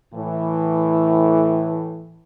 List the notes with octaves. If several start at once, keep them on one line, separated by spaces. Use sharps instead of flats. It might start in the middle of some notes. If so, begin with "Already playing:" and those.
A2 E3